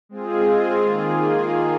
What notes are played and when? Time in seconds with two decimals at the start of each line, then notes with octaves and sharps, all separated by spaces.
0.09 G#3 C4 F4 G#4
0.82 D#3 A#3 F4 G#4